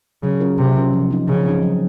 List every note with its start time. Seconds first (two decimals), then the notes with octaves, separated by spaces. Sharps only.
0.23 C#3 F#3
0.40 C#4 F4 A#4
0.58 C3 F#3
0.75 C#4 F4 A#4
0.93 F3
1.11 C4 D#4
1.28 C#3 F3
1.45 C4 D#4
1.63 F#3